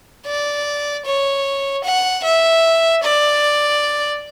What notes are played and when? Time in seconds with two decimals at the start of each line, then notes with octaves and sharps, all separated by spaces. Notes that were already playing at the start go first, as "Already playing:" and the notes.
0.26 D5
1.05 C#5
1.85 F#5
2.24 E5
3.03 D5